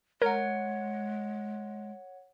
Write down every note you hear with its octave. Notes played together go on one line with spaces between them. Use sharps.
G#3 A#4 C#5 F#5